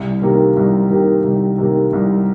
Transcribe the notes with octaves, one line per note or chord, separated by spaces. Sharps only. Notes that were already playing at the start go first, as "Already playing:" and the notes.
Already playing: C2
C3 D#3 A#3
C2
C3 D#3 A#3
C2
C3 D#3 A#3
C2